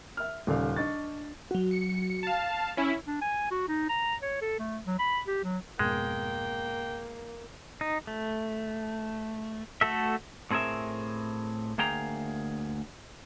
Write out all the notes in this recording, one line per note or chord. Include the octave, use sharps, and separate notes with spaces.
E5 F6
D#1 C#3 A4 D5 F5
D4 D#5 C#6 A6
F#3 F#4
C#7
F5 A5
C#4 E4 B6
D4
G#5
F#4
D#4
A#5
C#5
A4
A3
F#3
B5
G4
F#3
F2 G#2 B2 G#3 A#3 G5
D#4
A3
A3 F#4 A4 E5
A2 C4 G#4 A#4 E5
D2 A#3 G#4 G5 A#5